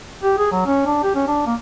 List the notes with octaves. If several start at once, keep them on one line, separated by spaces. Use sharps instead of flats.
G4
G#4
F#3
C#4
D4
G4
C#4
D4
A#3